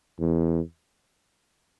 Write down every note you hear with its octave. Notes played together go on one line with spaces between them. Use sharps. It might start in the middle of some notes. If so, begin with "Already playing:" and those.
E2